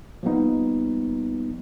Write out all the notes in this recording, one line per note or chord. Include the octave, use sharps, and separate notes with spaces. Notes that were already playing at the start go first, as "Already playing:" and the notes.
F3 G3 A#3 B3 D#4